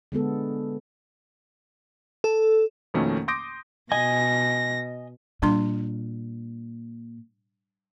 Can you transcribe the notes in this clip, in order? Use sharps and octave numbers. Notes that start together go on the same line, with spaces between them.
D3 G#3 B3 A4
A4
F2 B2 D#3 A3 A#3 C#4
C6 D6 D#6 G6 A#6 D7
B2 D#5 G#5 A#6
A#2 G3 D4 C6